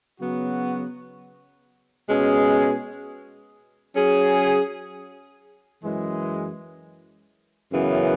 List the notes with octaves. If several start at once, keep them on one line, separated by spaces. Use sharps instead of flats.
C#3 F#3 B3 F#4
B2 G#3 C#4 G#4
F#3 C#4 G#4
F#2 E3 G#3
F#2 C#3 E3 B3